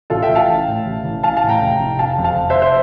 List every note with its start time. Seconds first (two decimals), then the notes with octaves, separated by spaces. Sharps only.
0.10 A1 F4 A4
0.22 E5 G5
0.29 A1
0.35 F5 A5
0.48 E3
0.68 A2
0.86 A1
1.04 A1
1.23 E3 F5 A5
1.37 F5 A5
1.43 A2
1.49 G5 A#5
1.61 F1
1.80 F1
1.99 C3 F5 A5
2.18 F2
2.24 F5 A5
2.38 F1
2.50 C5 E5
2.56 F1
2.62 C5 E5